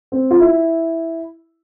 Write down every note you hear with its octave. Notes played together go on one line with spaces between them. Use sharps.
C4
F4
E4